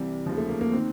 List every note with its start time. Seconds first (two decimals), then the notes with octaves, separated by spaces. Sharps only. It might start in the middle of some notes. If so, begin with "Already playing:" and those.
Already playing: C2 C3 E3 G3
0.26 D#2 C#3 F3
0.37 A3
0.49 A#3
0.61 A#3
0.72 D#3 C4